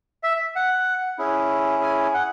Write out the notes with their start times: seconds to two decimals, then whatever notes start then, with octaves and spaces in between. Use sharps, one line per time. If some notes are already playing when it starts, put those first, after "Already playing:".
0.23 E5
0.56 F#5
1.18 C#4 E4 G#4
1.83 G#5
2.14 F#5